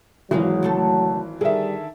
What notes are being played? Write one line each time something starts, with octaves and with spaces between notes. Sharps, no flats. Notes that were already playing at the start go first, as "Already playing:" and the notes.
G#1 E3 F#3 G#3 G#4 F5
C#3 A3 A4
D3 D#3 G3 G#4 A#4 E5